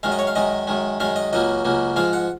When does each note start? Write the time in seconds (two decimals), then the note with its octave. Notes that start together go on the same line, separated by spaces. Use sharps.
0.03 F#2 D#3 G#3 F5
0.12 D#5
0.19 C#5
0.27 F5
0.35 F#2 D#3 G#3 D#5
0.67 F#2 D#3 G#3
1.00 F#2 D#3 G#3 F5
1.16 D#5
1.33 C#2 C#3 F#3 A#3 D#5
1.65 C#2 C#3 F#3 A#3
1.96 G#2 F3 G#3 F5
2.13 F#5